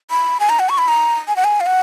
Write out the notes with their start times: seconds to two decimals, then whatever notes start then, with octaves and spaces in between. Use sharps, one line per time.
0.10 B5
0.40 G#5
0.49 A#5
0.59 F#5
0.69 C#6
0.78 B5
0.88 A#5
1.28 G#5
1.36 F#5
1.44 G#5
1.60 F5
1.66 F#5